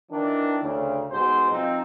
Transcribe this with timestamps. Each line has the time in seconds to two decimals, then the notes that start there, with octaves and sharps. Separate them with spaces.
0.11 D#3 E3 D4
0.61 D2 C#3
1.11 G#2 B2 C5
1.50 F3 C4 D#4